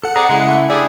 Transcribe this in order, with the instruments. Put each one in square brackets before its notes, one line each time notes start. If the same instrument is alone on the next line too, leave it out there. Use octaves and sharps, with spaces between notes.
[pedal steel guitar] A4 [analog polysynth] F#5 C#7
[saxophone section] C4 G#4 D5 [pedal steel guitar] A#5
[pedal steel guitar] C#3 E4 [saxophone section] G#3
[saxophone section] A3
[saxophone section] D4 E4 G#4 [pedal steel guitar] G4 [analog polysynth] D5